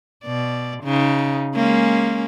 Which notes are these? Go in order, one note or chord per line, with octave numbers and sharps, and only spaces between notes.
B2 D5
C#3 D#4
G#3 A#3 C#4